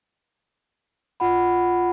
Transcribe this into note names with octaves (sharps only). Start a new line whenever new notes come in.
F4 F#5 B5